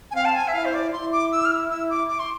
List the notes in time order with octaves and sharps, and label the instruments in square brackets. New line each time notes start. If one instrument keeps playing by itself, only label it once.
[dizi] G#5
[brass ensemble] C4 [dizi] F5
[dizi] A5
G#5
E5
[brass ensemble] E4 [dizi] F5
[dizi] C5
D5
[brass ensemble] E4 [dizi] C6
[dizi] D6
E6
F6
E6
E6
D6
D6
C6